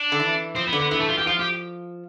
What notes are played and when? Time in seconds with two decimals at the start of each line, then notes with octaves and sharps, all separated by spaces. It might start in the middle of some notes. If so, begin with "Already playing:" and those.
Already playing: D4
0.12 D3
0.20 E3
0.55 F3 C4
0.67 B3
0.73 D3
0.79 B3
0.91 E3 B3
1.00 A3
1.09 F4
1.18 G4
1.27 F3 F4
1.39 G4